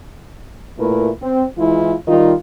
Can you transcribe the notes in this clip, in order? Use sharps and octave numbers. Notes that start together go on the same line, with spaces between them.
A#2 A3 E4 A#4 B4
C4
E3 G#3 E4 F4
D#3 G3 D#4 F4